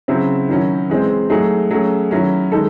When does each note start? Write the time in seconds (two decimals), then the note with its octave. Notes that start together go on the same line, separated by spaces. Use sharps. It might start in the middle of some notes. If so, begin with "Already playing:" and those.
0.08 C#3 F#3 C4 E4
0.49 D#3 F#3 C#4 E4
0.90 E3 G#3 C4
1.30 F#3 A3 D#4 G#4
1.71 F#3 A3 C#4 G#4
2.11 D#3 F#3 C#4 E4
2.52 D#3 G#3 D#4 A4